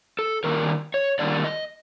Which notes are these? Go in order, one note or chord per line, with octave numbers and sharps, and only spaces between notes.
A4
D#3 G3 A#3 D4 A#4
C#5
D#3 G3 A#3 D4 D5
D#5